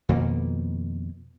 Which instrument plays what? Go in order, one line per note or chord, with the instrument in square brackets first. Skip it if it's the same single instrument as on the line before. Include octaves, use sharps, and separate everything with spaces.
[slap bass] F2 B2 D#3 A#3